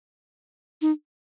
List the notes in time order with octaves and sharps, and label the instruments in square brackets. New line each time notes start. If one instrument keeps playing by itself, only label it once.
[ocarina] D#4